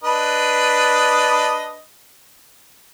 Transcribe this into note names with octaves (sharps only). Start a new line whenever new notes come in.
D4 B4 D#5